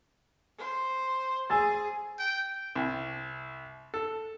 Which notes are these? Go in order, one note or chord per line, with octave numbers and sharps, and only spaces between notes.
C5
G#4 G#5 E6 A6
G5
C2
A4